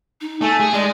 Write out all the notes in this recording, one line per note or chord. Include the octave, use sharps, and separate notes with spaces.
D#4
A3 G#5
G#4
G#3 D5